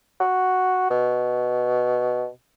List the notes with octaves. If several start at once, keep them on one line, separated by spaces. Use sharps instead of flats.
F#4
B2